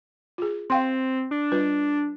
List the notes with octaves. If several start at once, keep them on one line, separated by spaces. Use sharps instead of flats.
F4 G#4
C4 F5 G5 C6
D4
G3 F4 B4